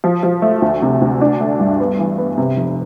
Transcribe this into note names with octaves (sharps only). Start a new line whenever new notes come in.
F3
F3
A3
D2
C3
D2
D4
A3
G2
B3
E3
B3
C3
F1